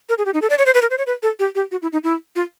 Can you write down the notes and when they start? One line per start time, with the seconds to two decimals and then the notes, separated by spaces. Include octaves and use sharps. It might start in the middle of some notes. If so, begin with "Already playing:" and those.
0.09 A#4
0.18 G#4
0.26 G4
0.34 D#4
0.42 A4
0.50 D5
0.58 C#5
0.66 C5
0.74 B4
0.82 A#4
0.90 C5
0.98 C#5
1.07 B4
1.23 A4
1.39 G4
1.55 G4
1.71 F#4
1.82 E4
1.93 D#4
2.03 E4
2.36 F4